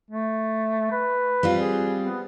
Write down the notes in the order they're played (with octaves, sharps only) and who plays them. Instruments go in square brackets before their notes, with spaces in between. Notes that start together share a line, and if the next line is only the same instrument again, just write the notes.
[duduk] A3
B4
[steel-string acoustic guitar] G3 C4 F4
[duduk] G#4
B3